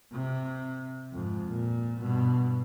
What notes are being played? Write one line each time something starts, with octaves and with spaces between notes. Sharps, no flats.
C3
F2 G#2
A#2
G2 B2